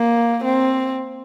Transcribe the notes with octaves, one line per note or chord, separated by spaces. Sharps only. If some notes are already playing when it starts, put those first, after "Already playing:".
Already playing: A#3
C4